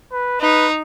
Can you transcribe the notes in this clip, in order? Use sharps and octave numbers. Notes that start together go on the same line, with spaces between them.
B4
D#4 B4